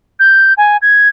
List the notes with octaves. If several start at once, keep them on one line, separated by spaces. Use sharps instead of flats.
G6
G#5
G#6